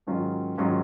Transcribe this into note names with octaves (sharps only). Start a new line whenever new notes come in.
G#2 D#3 F#3 C#4 F4
G#2 D#3 F#3 C#4 F4